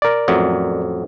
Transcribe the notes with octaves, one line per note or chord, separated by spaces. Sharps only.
A#4 D5
A1 F2 F#3